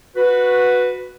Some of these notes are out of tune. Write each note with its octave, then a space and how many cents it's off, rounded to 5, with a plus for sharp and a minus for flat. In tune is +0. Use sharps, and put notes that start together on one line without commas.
F#4 -15 B4 +0